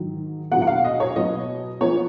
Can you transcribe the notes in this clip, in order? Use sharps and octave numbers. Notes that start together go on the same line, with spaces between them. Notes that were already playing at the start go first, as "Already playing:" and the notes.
Already playing: G#2 D#3 F#3
B2 F#3 B3 F#5
F#5
F5
D#5
C#5
B2 F#3 B3 D#5
F3 B3 C#5